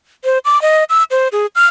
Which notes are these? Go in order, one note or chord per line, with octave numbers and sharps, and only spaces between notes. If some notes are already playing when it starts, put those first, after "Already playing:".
C5
D6
D#5
E6
C5
G#4
F6